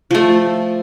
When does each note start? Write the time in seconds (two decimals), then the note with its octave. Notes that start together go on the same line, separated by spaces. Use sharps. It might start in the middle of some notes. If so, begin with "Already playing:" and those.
0.11 F3 A3